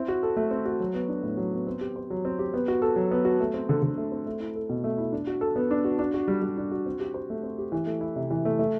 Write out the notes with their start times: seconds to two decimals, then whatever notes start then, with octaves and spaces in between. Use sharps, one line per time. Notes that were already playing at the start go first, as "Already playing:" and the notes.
Already playing: C4 E4
0.08 F#4
0.23 A4
0.37 A3
0.51 C4
0.65 F#4
0.80 F#3
0.94 B3
1.09 D4
1.23 A2
1.37 F#3
1.53 B3
1.67 C4
1.81 G4
1.96 C5
2.10 F#3
2.25 C4
2.39 G4
2.54 B3
2.68 F#4
2.82 A4
2.96 F#3
3.11 B3
3.25 F#4
3.40 A3
3.54 C4
3.69 D3
3.82 D3
3.97 A3
4.12 C4
4.26 A3
4.40 E4
4.56 A4
4.69 B2
4.84 A3
4.98 E4
5.13 D4
5.27 F#4
5.41 A4
5.56 B3
5.71 D4
5.85 F#4
5.99 D4
6.14 F#4
6.28 G3
6.42 G3
6.58 D4
6.72 F#4
6.86 C4
7.00 G4
7.14 C5
7.30 A3
7.43 C4
7.58 G4
7.72 E3
7.86 A3
8.01 E4
8.16 C3
8.31 E3
8.45 A3
8.59 A3